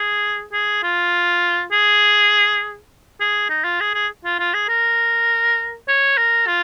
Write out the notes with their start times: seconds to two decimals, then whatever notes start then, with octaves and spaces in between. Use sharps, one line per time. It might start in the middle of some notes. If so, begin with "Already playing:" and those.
Already playing: G#4
0.53 G#4
0.83 F4
1.71 G#4
3.20 G#4
3.49 D#4
3.64 F4
3.80 G#4
3.94 G#4
4.24 F4
4.39 F4
4.54 G#4
4.69 A#4
5.88 C#5
6.17 A#4
6.47 F4